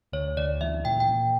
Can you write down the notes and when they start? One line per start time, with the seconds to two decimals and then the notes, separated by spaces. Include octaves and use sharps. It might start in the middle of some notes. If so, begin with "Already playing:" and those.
0.13 D2 C#5
0.37 D2 D5
0.61 E3 E5
0.85 A#2 G5
1.00 G5
1.09 A#2